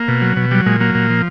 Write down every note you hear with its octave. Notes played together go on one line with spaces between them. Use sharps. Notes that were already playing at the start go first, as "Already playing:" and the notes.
Already playing: A#3
B2
F#3
B2
F#3 G3
A#2 G#3
F#3 A#3
A#2
F3